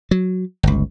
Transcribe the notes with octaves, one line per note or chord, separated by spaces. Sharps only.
F#3
G1 C#2